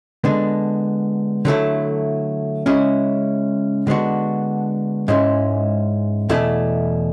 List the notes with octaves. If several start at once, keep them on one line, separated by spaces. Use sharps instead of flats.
D3 G#3 B3 D4
D3 F#3 A3 E4
C#3 G#3 C#4 E4
D3 G#3 B3 D4 F#4
G#2 G#3 C#4 E4
E2 B2 A3 E4